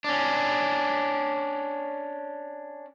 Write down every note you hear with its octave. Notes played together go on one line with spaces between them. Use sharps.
C#4 D4